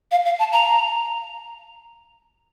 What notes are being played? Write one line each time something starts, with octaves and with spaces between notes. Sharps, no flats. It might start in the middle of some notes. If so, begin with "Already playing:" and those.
F5
F5
A5
A#5